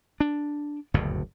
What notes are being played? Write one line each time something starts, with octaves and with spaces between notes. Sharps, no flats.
D4
F#1 D2 G2 B2